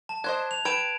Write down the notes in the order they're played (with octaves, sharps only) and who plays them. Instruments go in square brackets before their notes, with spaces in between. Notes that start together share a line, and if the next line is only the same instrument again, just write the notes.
[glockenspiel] A5
[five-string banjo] D4 C5 D#5 [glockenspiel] F#6 G#6
[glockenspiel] F7
[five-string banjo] B4 G5 [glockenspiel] G#6 D7 E7